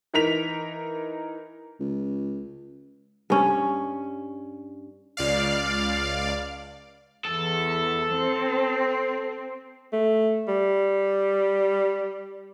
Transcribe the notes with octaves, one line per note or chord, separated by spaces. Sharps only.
E3 D#4 A#4 B6 F7
C#2
G2 C#4
C#2 D5 F5
E2 A4
C4
A3
G3